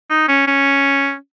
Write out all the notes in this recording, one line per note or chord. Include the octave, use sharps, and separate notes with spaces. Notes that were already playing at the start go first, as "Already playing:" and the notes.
D#4
C#4
C#4